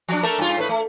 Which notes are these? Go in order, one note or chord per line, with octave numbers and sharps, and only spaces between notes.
F3 D4
A3 A4 A#4
G2 F4
A2 B4
A3